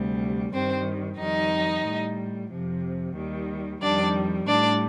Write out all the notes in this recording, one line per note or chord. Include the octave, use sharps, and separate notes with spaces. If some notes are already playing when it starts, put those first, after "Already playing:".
Already playing: D2 C3 G3
G2 D#3 G3 C4 C5
F2 D#3 G3 D#4 D#5
A2 G3
F2 C3 F3
D#2 D#3 G3
F2 D#3 G3 D4 D5
A2 G3 D4 D5